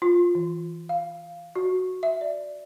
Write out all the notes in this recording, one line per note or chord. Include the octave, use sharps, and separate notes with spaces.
F4
E3
F5
F#4
E5
D5